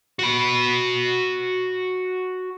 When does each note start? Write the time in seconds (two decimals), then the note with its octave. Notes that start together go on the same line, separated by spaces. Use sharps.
0.19 F#4 B5